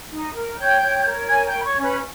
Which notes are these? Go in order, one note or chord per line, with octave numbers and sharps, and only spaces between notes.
D#4
A#4
C#5 G5 G6
C#5
A#4
C#5 G#5 G#6
G5 G6
C#5
B5
C#5 C#6
C#4
B4 B5